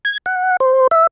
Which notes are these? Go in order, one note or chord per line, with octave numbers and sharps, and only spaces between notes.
G#6
F#5
C5
E5